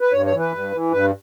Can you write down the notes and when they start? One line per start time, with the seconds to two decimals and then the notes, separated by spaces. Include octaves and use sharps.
0.01 B4
0.13 G2 C#5
0.26 C#5
0.32 E3
0.40 B4
0.52 G2
0.73 E3
0.91 G2 B4